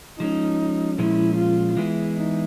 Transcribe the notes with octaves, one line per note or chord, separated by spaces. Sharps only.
F3 G#3 C#4 D#4
A#2 F3 G#3 C#4 E4
F4
E3 G#3 B3 E4 G#4
D#4